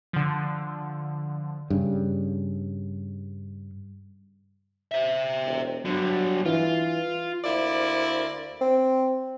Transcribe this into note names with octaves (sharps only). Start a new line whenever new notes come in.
D3 F3
G2 C#3
C5 E5
E1
G2 D3 F#3
E3 F4
D2 A#3 E4 C5 D5
C4